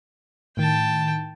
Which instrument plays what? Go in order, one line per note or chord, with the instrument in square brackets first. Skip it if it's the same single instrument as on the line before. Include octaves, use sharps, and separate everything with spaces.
[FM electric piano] A2 D#3 [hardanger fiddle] G5 A5